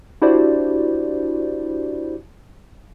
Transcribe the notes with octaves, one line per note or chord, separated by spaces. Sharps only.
D4 E4 F#4 G4 C5 D5